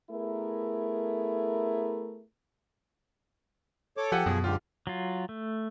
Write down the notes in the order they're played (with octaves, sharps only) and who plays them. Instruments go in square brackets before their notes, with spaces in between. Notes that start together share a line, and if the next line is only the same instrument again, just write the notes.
[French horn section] A3 B3 E4 G#4 A#4
[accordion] A4 C#5 D6
[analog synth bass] F3 [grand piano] G4 A4 F#5 [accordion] G#5
[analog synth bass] F#2 [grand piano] B2 [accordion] F3 G#4
[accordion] G#2 D3 G4 [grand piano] F4
[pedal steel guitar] F#3 F4
A3